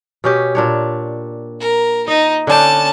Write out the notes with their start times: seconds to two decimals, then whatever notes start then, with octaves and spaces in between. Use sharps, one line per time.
0.24 B2 C#4 G4
0.55 A#2 D4 C#5
1.60 A#4
2.08 D#4 D#5
2.47 D3 C#4 D4 G5 A5